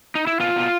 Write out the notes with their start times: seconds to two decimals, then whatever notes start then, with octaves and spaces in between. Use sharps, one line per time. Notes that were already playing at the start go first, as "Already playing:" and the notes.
0.15 D#4
0.27 E4
0.40 B2 F4
0.56 B2